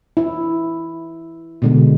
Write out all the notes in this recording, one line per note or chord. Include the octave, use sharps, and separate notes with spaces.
E4
B2 D3 G#3